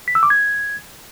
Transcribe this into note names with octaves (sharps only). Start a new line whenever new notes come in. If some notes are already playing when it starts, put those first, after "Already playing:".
B6
E6
D6
G#6